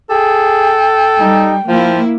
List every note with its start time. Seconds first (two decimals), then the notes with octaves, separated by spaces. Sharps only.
0.10 G#4 A4 G5
1.20 G3 D#4
1.68 F3 A#3 E4 F4